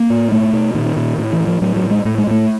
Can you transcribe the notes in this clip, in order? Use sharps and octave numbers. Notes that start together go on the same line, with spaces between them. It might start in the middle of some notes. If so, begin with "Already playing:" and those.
Already playing: A#3
A2
B2 A3
B2
A#2 D#3
A#2
A2
E3
A2
F3
A2 F#3
F#3
A2
G#3
A2 A3
G#3
A2 A3